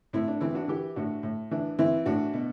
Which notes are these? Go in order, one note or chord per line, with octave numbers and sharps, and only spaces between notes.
A2 C4 E4
D4
E3 C4 E4
D4 F#4
E3 E4 G4
A2 D4 F#4
A2
E3 D4
E3 C4 E4
A2 D4 F#4
B2